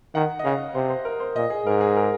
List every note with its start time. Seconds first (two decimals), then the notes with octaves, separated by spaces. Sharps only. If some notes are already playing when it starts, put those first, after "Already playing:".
0.15 D#3 F#5
0.39 D#5
0.45 C#3 F5
0.75 C3 C5
0.90 C5
1.05 A#4
1.20 C5
1.36 A#2 D#5
1.50 G#4
1.67 G#2 A#4
1.81 G#4
1.97 A#4